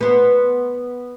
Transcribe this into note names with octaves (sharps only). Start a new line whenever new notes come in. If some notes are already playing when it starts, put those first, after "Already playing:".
B3 C5